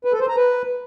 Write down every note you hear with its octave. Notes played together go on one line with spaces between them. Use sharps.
B4
A4
C5
A#5
B4